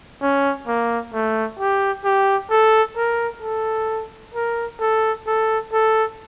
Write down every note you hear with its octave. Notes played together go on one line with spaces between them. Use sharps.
C#4
A#3
A3
G4
G4
A4
A#4
A4
A#4
A4
A4
A4